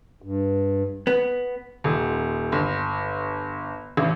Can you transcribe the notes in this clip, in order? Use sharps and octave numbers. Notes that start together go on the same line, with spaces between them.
G2
B3
D#1
G1
A1